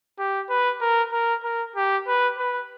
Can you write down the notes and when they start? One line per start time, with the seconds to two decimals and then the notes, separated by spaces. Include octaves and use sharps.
0.19 G4
0.49 B4
0.81 A#4
1.13 A#4
1.44 A#4
1.76 G4
2.07 B4
2.38 B4